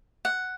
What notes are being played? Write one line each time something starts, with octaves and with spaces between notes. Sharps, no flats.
F#5